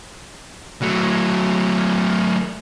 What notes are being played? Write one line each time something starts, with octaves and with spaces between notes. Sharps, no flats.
F#3 A3